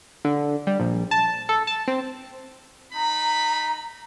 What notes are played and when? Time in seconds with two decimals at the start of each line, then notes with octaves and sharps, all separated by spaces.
0.25 D3
0.67 G3
0.80 A#1
1.11 A5
1.49 A4
1.67 A5
1.88 C4
2.94 D#4 A#5 B5